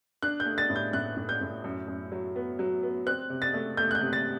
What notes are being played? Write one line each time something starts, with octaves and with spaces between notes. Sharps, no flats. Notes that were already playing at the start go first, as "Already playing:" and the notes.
D4 F#6
G6
A3
A6
A2
G6
A2 F#6
A2
G6
A2
F#2
F#2
F#3
B3
F#3
B3
C4 F#6
C3
A6
A3
A3 G6
F#6
G6
C3
A6